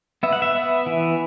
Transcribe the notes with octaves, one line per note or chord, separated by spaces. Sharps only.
B3 E5
F#5
E5
B3
E3